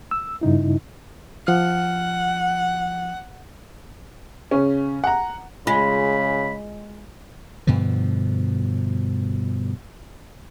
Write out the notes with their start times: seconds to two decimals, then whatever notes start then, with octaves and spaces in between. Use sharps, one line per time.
0.11 E6
0.41 G2 C#3 D#4 E4
1.47 F3 F#5 F6
4.51 C#3 C#4
5.04 F#5 A#5
5.67 C#3 G#3 F4 B5
7.67 G2 B2 D3 F3